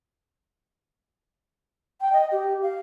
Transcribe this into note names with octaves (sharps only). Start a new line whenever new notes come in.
G5
D#5
G4
F5